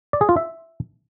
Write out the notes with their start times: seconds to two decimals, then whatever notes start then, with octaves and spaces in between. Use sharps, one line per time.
0.13 D5
0.21 G#4
0.29 F4
0.36 E5